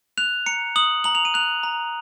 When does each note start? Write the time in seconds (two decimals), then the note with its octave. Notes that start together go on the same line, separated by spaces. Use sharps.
0.18 F#6 F7
0.46 A#5 C#7
0.76 D#6 F#7
1.04 A#5 F#7
1.15 F7
1.25 D#7
1.34 F#6 F7
1.63 A#5